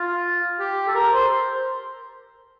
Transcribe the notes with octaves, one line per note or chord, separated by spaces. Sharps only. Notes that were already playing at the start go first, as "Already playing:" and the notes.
Already playing: F4
G4
A4
A#4
C5